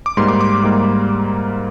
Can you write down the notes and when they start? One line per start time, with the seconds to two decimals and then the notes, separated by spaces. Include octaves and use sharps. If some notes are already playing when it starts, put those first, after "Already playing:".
0.06 D6
0.17 G#2 G3 A#3 C6
0.28 D6
0.41 D6
0.63 G#2 G3 A#3